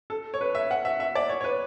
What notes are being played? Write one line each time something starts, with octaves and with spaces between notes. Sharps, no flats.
A4
C#5
B4
E5
F#5
E5
E5
D5
C#5
C#5
B4